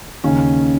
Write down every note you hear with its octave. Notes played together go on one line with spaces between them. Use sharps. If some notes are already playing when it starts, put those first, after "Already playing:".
D#2 C#3 C#4